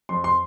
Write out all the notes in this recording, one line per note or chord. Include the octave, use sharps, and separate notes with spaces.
F2 C6
C6